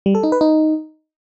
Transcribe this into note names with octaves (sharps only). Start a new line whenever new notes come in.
G3
A4
D#4
B4
D#4